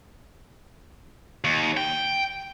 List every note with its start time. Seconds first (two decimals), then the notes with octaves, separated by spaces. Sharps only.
1.44 D#2
1.77 G5